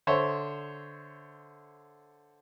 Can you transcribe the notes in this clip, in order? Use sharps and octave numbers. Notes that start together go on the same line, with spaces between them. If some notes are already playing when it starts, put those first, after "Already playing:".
D3 C5 C#5 E5